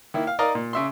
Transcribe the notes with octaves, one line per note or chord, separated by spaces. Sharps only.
D#3 A#3 E4
F5
D#4 A#4 D5 D#5 F5 A#5
A#2
C#3 E5 C6